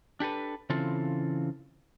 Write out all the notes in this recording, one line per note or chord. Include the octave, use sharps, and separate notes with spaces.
D4 G4 A4 B4
C#3 E3 C4 F4 A4